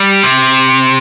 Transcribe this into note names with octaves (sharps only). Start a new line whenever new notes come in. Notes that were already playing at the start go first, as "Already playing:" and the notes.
Already playing: G3
C3